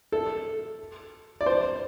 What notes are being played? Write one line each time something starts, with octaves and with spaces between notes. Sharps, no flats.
A4
D5
C5